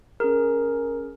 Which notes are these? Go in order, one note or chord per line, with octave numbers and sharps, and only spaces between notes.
C#4 G#4 A#4